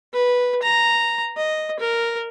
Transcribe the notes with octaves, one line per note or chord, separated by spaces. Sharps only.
B4
A#5
D#5
A#4